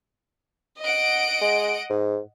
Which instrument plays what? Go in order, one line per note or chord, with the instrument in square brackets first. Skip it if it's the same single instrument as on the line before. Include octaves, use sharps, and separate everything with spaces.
[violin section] D#5 F#5 D7
[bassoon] G#3
G#2